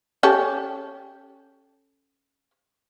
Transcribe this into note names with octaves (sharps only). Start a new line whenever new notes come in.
C#4 G4 A4